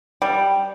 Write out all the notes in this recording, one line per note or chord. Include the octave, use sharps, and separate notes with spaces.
G3